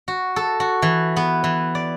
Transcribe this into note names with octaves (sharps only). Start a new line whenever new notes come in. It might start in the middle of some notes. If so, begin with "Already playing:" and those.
F#4
A4
F#4
E3
B3
E3
D5